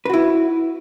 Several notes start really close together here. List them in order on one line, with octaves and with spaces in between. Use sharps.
B4 F#4 E4